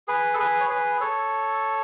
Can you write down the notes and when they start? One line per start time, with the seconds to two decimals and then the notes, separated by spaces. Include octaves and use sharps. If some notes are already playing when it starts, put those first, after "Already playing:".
0.08 G#4 B4
0.34 A4
0.39 G#4 B4
0.60 C#5
0.70 G#4 B4
1.00 A4 C#5